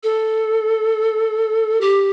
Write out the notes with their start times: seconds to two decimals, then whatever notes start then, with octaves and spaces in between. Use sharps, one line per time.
0.03 A4
1.81 G4